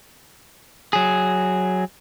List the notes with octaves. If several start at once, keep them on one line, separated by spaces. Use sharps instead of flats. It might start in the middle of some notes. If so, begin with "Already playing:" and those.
F#3 G#4